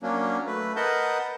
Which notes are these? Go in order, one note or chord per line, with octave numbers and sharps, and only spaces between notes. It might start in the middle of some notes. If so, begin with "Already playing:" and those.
F#3 A#3 C#4 D4
A3 B4
A#4 B4 D#5 F#5 A5 G6